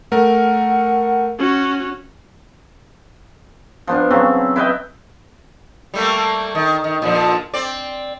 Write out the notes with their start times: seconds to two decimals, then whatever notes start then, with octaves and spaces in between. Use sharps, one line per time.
0.12 A3 A#4 F#5
1.39 C#4 F#4
3.87 F3 B3 D4
4.11 C#3 F#3 C4
4.56 E4 B4 D#5 G5
5.94 G3 A3 A#3
6.55 D#3
6.84 D#3
7.02 A#2 D3 F3
7.54 C4 D5